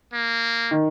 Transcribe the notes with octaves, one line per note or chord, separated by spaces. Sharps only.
A#3
D#3